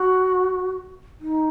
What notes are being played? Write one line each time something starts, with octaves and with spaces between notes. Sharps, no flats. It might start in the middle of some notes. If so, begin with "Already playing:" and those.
Already playing: F#4
D#4